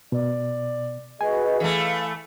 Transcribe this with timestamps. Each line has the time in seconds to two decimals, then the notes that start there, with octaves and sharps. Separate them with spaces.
0.12 B2 D5
1.21 F#4 G#4 B4 D#5 G#5
1.60 E3 A3 F5